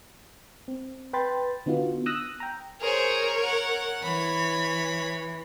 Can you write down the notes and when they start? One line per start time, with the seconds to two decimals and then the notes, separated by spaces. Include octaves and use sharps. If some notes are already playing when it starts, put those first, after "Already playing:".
0.68 C4
1.13 B4 G5 B5 C6 A6
1.66 D3 B3 D#4 F4 F#4
2.06 D#6 E6 F#6 A#6
2.40 G5 A#5
2.81 G#4 A#4 C5 C#5
3.43 F#5
4.03 E3 C#5 B5